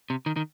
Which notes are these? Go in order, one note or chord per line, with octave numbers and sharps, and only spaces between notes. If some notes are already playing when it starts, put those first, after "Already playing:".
C3
D#3
D#3